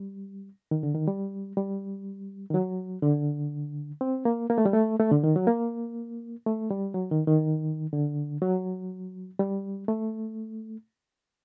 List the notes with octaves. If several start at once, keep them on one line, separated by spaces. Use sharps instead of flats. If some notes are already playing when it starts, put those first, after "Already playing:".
Already playing: G3
D#3
D3
D#3
G3
G3
D#3
F#3
D3
C4
A#3
A#3
A3
G3
A3
A3
D3
D#3
F#3
A#3
A3
G3
F#3
D#3
D#3
D3
F#3
G3
A3